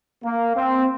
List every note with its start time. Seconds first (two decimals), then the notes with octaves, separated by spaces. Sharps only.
0.24 A#3
0.56 C4